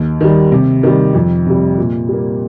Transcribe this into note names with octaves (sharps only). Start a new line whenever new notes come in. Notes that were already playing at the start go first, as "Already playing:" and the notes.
Already playing: D#2
D#3 G3
C3
D#3 G3
F2
C3 G3
A#2
G3 A#3